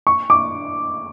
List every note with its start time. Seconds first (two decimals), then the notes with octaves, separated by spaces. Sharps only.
0.07 C#6
0.30 D6